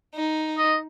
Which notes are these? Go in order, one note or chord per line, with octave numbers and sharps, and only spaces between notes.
D#4
D#5